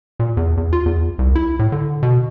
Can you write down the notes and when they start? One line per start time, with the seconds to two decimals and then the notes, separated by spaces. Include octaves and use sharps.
0.19 A#2
0.37 E2
0.57 E2
0.73 F4
0.86 E2
1.19 C2
1.35 E4
1.59 A2
1.72 D3
2.03 B2